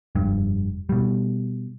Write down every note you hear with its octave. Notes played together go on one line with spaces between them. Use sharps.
F1 G2
B2 G3